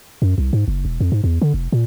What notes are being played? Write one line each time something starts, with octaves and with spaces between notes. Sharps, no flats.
F#2
C2
G#2
F#1
E1
F2
G#2
E2
D3
F1
A#2